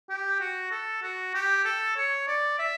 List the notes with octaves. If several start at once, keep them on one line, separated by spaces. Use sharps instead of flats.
G4
F#4
A4
F#4
G4
A4
C#5
D5
E5